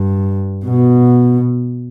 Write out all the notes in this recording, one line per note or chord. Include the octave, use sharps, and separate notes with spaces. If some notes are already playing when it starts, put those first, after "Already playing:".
Already playing: G2
B2